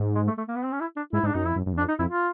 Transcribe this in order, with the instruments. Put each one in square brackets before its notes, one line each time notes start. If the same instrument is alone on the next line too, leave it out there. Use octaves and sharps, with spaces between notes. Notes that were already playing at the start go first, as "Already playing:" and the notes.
Already playing: [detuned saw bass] G#2
[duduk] G#3
A3
A3
A#3
B3
C4
C#4
E4
D4
[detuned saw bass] G#2 [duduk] E4
[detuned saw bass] G#2
[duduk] D4
[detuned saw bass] F#2 [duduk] D#4
[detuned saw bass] F2 [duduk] E4
[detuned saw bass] F#2
F#2
E2
[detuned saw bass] F2 [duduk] D4
[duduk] D#4
[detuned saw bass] F2 [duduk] E4
[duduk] F4